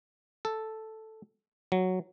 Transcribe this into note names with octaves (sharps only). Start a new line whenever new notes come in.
A4
F#3